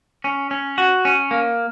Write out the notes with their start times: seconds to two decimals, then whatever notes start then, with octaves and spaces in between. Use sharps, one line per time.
0.24 C#4
0.51 C#4
0.78 F#4
1.05 C#4
1.31 A#3